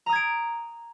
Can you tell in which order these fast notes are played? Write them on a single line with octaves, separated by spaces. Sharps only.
A#5 D#6 G#6 D7